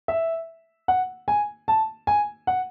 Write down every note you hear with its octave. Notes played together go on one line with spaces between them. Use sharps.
E5
F#5
G#5
A5
G#5
F#5